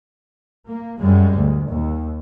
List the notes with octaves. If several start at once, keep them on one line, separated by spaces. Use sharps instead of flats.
A#3
F#2 G3 G#3
D2
D#2